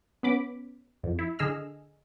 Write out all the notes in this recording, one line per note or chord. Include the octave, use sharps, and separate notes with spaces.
B3 C#4 B5 D6
F2
E4
D3 G#4 D#5 E6 F6